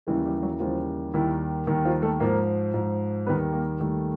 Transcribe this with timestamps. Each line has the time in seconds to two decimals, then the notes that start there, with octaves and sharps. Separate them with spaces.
0.07 D#2 C#3 E3 G3 G#3 G#4
0.25 G3 G4
0.43 F#3 F#4
0.60 D#2 C#3 E3 F3 G3 F4
1.14 D#2 D#3 G3 E4
1.67 D#2 D#3 G3
1.85 F3 F4
2.02 A3 A4
2.20 G#2 F3 A#3 A#4
2.74 G#2 F3
3.26 D#2 D#3 G3 B3 B4
3.53 A#3 A#4
3.80 D#2 D#3 G3 A3 A4